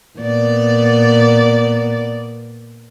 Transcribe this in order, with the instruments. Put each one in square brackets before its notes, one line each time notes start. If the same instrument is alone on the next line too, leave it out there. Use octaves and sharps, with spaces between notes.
[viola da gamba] A#2 B3 D5